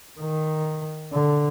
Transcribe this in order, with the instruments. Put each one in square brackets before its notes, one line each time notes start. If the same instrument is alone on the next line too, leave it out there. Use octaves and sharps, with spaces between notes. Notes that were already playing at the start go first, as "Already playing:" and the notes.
[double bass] D#3
D3